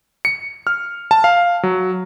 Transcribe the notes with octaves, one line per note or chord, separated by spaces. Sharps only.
C#7
F6
A5
F5
F#3